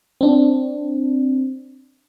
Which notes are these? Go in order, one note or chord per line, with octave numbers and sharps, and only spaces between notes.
C4 D4